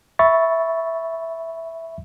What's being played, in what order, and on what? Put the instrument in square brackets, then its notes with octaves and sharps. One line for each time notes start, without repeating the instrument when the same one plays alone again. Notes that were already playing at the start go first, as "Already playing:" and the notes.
[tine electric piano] E5 B5 C#6 A6